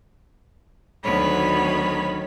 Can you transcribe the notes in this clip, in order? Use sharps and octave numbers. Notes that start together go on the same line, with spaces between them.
D2 D#3 F#3 B3 C#5 B5